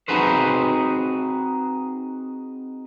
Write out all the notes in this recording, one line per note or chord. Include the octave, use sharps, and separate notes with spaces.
C4 D#4 F#4 G#4 B4 C5